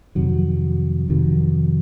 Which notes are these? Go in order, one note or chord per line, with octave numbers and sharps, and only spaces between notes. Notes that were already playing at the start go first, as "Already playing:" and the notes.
F2 C3 D#3 F#3
F2 C3 D#3 F#3